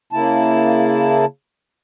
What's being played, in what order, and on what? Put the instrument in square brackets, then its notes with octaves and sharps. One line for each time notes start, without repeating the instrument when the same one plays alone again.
[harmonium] C#3 A#3 E4 A5